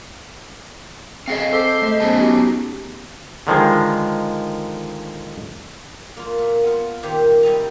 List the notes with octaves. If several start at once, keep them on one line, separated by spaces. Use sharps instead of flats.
C4 G#4 A4 C#5 D#5 F5
A4 C5 D6 B6
A3 D#5
F#3 B3 C#4 G#4 A5
D#4 F#4 G4
D3 D#3 F3 G#3
A#3 F4
A#2
B3 F4
A#2 D#3 G4 C5 A#5
C3 G3 D#5 A#5